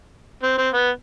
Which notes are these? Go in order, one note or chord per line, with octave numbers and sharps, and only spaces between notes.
C4
C4
B3